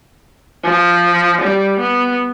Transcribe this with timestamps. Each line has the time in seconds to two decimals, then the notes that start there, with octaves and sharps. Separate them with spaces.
0.64 F3
1.41 G3
1.80 B3